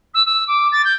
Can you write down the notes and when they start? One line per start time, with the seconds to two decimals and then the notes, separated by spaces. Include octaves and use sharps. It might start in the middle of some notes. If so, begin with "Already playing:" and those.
0.14 E6
0.25 E6
0.47 D6
0.72 A6
0.84 G6